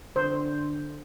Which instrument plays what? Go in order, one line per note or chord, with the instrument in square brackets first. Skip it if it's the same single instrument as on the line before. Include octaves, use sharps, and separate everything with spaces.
[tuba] D3 [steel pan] C5